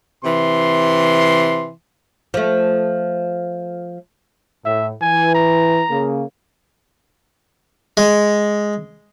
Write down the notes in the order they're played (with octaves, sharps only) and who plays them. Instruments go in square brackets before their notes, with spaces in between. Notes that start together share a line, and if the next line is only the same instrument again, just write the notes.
[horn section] C3 E3 C6
[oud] F3 A3
[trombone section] A2 [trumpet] E5
[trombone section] E3 [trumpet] G#5
[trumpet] A#5
[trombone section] C#3 A#3
[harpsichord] G#3